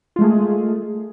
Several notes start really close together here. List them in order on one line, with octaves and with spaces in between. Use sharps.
F4 G#3 A3 G#4